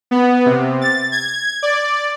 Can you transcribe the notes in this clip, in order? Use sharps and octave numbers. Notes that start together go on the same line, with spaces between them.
B3
C3
A6
G#6
D5